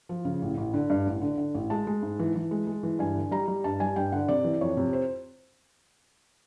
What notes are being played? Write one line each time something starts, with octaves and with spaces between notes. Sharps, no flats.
F3
C#3
A1
A1
D3
G2
A1
D3
D3
A1
G#3 A5
G#3
G#2
E3
E3
G#3
G#3
E3
G2 G#5
D3
G3 A#5
G3
G2 A5
G3 G#5
G2 G5
D3 F#5
C3 D5
E3
F2 C#5
C3
C5